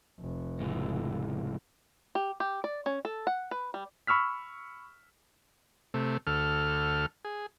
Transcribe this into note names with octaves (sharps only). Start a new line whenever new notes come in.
F1
C#2 A2
G4
G4
D5
C#4
A4
F#5
B4
G3
B5 C#6 E6 F6 B6
C3 A3
D2 A4 F6
G#4